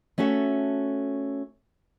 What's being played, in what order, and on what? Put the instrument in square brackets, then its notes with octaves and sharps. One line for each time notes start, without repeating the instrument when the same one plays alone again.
[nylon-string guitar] A3 C#4 F#4 A4 E5